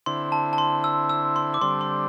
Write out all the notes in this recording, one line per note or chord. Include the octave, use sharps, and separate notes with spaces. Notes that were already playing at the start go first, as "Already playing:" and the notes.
D3 C4 E4 C6
A5
A5
C6
E6
E6
C6
D6
D3 G3 C4 C6
C6